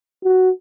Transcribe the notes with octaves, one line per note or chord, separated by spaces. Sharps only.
F#4